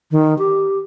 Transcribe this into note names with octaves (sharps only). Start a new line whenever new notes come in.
D#3
G4